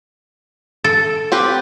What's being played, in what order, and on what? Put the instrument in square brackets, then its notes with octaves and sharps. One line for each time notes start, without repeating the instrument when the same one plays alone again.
[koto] A4
[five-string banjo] C4 G4 B4